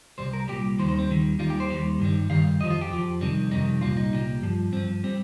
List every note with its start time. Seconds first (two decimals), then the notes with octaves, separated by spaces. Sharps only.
0.18 C2 A#2 G3 C5
0.33 A#4
0.48 C2 A#2 G3 G4
0.79 D#2 D#3 G3 C5
0.89 C5
0.99 C4
1.09 D#2 D#3 G3
1.39 D#2 D#3 G3 F4
1.50 G4
1.60 C5
1.70 D#2 D#3 G3
2.00 G2 D#3 G3
2.30 G2 D#3 G3 F5
2.60 F2 D#5
2.64 F3
2.70 F4
2.81 G4
2.90 F2 F3
3.21 F2 C3 D#3 G3
3.51 F2 C3 D#3 G3 D#4
3.81 C2 A#2 G3 F4
3.97 D#4
4.12 C2 A#2 G3
4.42 G2 F3
4.72 G2 F3 C4
5.04 G3 C4